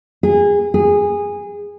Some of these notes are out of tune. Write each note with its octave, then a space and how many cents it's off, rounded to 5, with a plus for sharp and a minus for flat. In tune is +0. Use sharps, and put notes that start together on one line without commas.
G#4 -25
G#4 -20